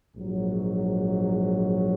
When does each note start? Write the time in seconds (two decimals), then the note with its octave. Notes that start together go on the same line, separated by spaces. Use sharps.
0.16 A#1 G#2 F#3